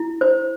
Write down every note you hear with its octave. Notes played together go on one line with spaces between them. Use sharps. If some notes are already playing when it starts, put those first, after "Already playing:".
Already playing: E4
C5